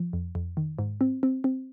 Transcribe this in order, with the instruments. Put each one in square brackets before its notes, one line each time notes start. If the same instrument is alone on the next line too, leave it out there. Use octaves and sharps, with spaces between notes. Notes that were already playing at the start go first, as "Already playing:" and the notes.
Already playing: [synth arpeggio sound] F3
F2
F2
D#3
G#2
C4
C4
C4